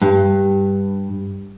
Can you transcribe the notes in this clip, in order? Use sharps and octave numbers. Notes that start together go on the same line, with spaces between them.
G2